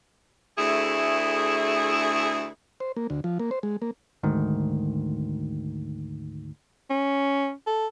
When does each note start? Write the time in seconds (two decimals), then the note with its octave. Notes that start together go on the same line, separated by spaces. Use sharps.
0.58 D2 A3 E4 G#4
2.80 C5
2.97 A#3
3.10 D2
3.24 F3
3.39 A#3
3.51 C5
3.63 G#3
3.82 A#3
4.23 D2 G#2 D#3
6.90 C#4
7.67 A4